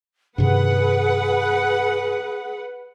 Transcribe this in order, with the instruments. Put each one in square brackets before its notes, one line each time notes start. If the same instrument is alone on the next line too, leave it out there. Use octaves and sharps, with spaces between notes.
[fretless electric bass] G2 C3 D#3 [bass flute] G#4 [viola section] B4 F#5